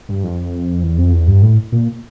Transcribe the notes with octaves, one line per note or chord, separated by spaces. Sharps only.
G2
F2
E2
F2
E2
G2
A2
A#2